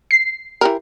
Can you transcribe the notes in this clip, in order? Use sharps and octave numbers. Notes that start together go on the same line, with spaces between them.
C7
E3 G4 A#4